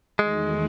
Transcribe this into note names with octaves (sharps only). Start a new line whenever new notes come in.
E2 D#3 G#3 A3 D#4 F#4